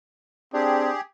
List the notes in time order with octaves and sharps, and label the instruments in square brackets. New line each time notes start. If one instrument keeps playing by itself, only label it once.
[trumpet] C4 [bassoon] D4 [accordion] G4 G#4